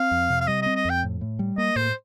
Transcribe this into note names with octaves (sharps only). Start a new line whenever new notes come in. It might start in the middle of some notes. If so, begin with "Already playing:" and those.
Already playing: C4 F5
F2
C3
F5
G3 D#5
C4 D#5
D#5
F2 G5
A2
A2
G3
A#3 D#5
A2 C5